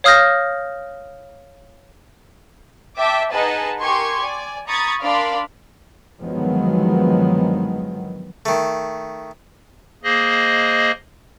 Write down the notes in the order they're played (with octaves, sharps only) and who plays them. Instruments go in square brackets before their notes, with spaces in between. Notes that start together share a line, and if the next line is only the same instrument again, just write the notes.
[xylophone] C#5 F5 D#6 F6 G6 A#6
[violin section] E5 G5 A5 D6
D#4 G#4 B4 D#5 F#5 A5
G4 A#4 G#5 C6 C#6 G#6
D5 G#5
A#5 B5 C#6 D#6 G#6 A6
D4 A#4 D5 F5 B5 C6
[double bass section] G1 D#3 F3 F#3 G#3 B3
[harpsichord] D#3 A3
[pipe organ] A#3 G#4 C5 D#5